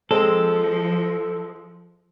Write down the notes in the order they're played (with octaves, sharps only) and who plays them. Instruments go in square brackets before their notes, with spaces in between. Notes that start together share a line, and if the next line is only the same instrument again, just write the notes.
[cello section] F3 [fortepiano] G#3 C4 [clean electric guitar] A4